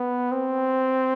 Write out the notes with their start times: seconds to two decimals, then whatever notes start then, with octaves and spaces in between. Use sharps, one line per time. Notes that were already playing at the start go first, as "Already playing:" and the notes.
Already playing: B3
0.32 C4